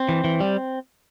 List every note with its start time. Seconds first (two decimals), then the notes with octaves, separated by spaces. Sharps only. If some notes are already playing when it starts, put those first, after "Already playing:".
Already playing: C4
0.09 E3
0.24 E3
0.40 G3